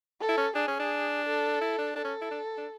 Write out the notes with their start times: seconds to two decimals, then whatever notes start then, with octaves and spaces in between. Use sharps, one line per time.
0.21 A4
0.29 E4
0.38 C#4
0.55 D4 G#4
0.68 C#4
0.79 D4
1.26 A4
1.61 E4
1.78 D4
1.95 D4 A4
2.04 C#4
2.22 E4
2.31 D4
2.57 D4